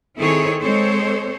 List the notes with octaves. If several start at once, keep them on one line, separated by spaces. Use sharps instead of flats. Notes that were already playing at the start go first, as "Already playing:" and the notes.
D#3 C4 E4 G#4 A4 C#5
G#3 C4 A4 C5 C#5